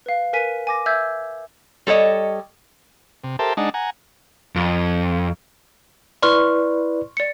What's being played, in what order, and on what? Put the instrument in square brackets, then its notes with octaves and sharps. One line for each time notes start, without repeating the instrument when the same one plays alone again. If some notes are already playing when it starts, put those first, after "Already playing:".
[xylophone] B4 F5
A#4 B4 G#5 B6 D#7
G#5 D6 A#6
E5 E6 G6 G#6
[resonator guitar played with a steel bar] G3 A4 C#5 D#5
[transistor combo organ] C3
G4 A4 A#4 C5 E5 A5
G#3 D4 D#4 F#5 A5
F#5 G#5 A#5
[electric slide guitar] F2
[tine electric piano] E4 B4 D5 [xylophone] C6 C#6 F6
[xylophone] D5 C#7